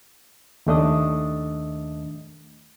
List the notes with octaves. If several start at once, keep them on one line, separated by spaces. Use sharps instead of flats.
D#2 D#3 A3 D4 D#5 D#6